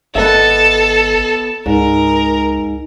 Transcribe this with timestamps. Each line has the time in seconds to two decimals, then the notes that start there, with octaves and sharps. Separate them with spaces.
0.15 G#1 B3 A4 D#5 E5
1.66 C#2 G#2 A#4